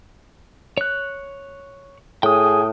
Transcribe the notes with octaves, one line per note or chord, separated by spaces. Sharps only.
C#5 F#6
A2 G#4 G5 D#6